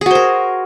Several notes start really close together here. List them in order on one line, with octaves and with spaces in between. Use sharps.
G#4 F#4 C5 A#4